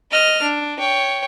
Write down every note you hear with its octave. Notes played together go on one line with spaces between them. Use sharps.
D#5 F6
D4
C#5 G5